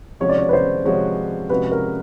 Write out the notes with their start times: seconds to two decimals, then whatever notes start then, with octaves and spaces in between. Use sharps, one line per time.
0.20 C3 F3 G#3 C#4 F#4 C#5
0.29 D5
0.38 C#5
0.49 B4
0.53 C5
0.85 C3 F3 G#3 C#4 F#4 C#5
1.50 C3 F3 G#3 C#4 F#4 B4
1.72 A#4